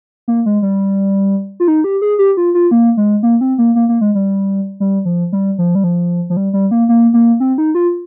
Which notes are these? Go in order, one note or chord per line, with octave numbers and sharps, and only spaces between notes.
A#3
G#3
G3
F4
D#4
G4
G#4
G4
F4
F4
A#3
G#3
A#3
C4
A#3
A#3
A#3
G#3
G3
G3
F3
G3
F3
G3
F3
F3
G3
G3
A#3
A#3
A#3
C4
D#4
F4